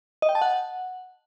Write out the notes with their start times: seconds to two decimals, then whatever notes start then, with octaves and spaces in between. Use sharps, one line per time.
0.22 D#5
0.29 G5
0.35 A5
0.42 F#5